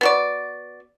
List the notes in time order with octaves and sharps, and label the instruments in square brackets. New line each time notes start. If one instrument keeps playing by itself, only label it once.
[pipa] B3 F#4 D5